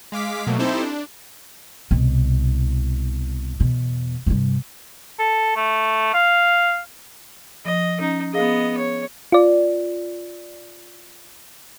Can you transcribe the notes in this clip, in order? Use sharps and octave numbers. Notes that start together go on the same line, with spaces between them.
G#3 F5 D6 B6
B2 F#3 A3 A#3
C4 D#4 E4 G4 A4 C5
D4
C2 B2
E2 B2
G2 C3
A4
A3
F5
F3 D#5
C#4 D#4
B3 G#4 D#5 F5
C#5
F4 D5